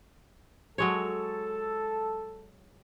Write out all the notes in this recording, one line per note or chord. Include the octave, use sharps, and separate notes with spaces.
F#3 G#3 A4 C#5